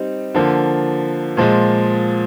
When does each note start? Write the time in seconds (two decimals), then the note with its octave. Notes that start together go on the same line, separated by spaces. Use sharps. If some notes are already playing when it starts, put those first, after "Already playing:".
Already playing: G3 C4 D#4
0.34 D3 F3 A#3
1.37 A#2 F3 G#3